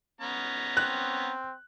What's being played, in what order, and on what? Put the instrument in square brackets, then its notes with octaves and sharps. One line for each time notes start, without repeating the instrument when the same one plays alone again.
[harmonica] B3 C#4 A#5
[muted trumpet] C4 [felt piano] F#6